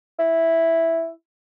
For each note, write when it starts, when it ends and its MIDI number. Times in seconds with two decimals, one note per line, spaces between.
0.19 1.10 64